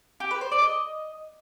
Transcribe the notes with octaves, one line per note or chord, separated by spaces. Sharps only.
G4
B4
C5
D5
D#5